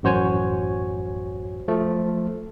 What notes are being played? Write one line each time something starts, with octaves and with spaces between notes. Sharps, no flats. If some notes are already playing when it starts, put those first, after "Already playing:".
A1 F#2 F#4 C5 C#5 G#5
F3 A3